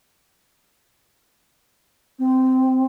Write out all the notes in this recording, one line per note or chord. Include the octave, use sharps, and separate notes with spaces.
C4